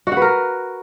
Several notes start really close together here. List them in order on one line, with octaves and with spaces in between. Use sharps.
F#4 F#5 B4 A#4